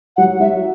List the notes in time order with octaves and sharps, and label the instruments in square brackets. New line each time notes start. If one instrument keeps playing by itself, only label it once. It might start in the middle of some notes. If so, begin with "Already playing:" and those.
[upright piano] F#3 [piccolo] F#5
[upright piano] F#3 [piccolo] E5